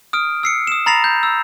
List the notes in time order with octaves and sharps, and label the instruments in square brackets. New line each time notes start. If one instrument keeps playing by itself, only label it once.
[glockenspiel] D#6 F6 D7
E6 C7 C#7
D#6 E7
A#5 B5 A6 A#6 C7 F7
G6
E6